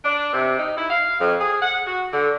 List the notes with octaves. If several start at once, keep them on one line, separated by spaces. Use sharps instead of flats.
D4
C3
D#4
E4
F5
F2
G#4
F#5
F#4
D3